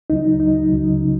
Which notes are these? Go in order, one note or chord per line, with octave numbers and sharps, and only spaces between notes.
C#2 C#3 F#3 D#4
C#2 C#3 F#3 D#4
C#2 C#3 F#3
C#3 F#3